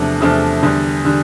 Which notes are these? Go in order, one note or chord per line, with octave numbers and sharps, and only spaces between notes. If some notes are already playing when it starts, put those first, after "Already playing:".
Already playing: E2 C3 F3 A3 D4
E2 C3 F3 A3 D4
E2 D3 G3
D3 G3